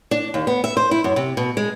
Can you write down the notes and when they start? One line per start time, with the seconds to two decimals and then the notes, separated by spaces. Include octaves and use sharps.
0.11 D4
0.34 D#2
0.47 B3
0.64 E5
0.77 C5
0.91 E4
1.04 F#2
1.16 C3
1.37 B2
1.57 G#3